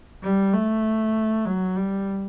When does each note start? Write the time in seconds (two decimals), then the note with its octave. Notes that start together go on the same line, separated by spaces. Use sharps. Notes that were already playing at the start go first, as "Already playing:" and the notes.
0.23 G3
0.53 A3
1.46 F#3
1.77 G3